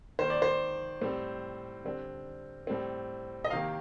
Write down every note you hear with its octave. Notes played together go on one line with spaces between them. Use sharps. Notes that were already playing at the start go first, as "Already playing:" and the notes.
D#3 A#3 C5
D5
C5
A2 G3 C4
D3 G3 C4
A2 G3 C4
D#5
C3 D#3 A#3 F5